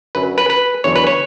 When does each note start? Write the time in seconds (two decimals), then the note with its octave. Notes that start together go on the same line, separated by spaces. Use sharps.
0.15 F#2 D3 F#3 B4
0.38 B4
0.50 B4
0.84 E2 D3 F#3 C#5
0.96 B4
1.07 C#5